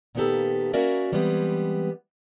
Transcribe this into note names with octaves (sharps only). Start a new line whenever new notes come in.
A#2 D#3 A#3 B3 G4 A4
A#3 C#4 F#4 A#4 D5 E5
E3 G3 G#3 B3 C4